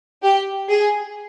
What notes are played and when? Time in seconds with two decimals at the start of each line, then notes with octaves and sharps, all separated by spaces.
0.23 G4
0.69 G#4